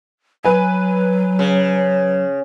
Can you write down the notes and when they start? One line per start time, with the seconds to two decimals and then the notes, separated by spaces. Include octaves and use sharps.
0.45 F#3 B4 G#5
1.39 C#3